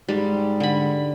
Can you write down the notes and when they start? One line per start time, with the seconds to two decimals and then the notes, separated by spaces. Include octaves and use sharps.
0.09 G#2 G3 G#3
0.60 D3 B5